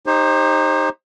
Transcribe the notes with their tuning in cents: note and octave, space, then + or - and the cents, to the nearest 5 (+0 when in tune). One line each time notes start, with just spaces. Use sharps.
D#4 -5 G4 +20 C5 +30